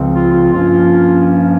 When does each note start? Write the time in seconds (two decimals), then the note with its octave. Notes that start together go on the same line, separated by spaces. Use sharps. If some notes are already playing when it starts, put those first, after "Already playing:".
Already playing: C#2 C#3 F3 C4
0.13 F4
0.32 F4
0.52 G2 F3 A#3 C#4 F4